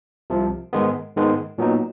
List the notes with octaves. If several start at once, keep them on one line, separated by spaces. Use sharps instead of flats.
C2 C3 F3
G#2 D#3 G#3 B3
G#2 D#3 G#3 B3
A#2 F#3 B3 D#4